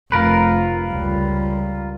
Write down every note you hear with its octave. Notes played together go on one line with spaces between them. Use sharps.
F1 F4 A#4 B4
C#2 G3